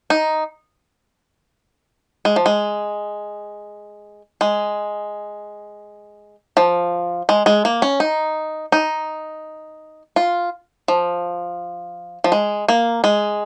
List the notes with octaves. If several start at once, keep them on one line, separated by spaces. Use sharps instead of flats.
D#4
G#3
F3
G#3
G#3
F3
G#3
G#3
A#3
C#4
D#4
D#4
F4
F3
F3
G#3
A#3
G#3